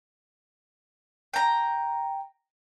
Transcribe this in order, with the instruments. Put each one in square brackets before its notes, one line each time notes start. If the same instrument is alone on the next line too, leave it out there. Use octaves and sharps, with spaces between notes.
[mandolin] G5 A#5